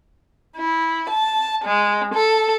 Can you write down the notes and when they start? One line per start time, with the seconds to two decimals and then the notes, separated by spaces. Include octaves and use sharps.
0.56 E4
1.09 A5
1.64 G#3
2.13 A4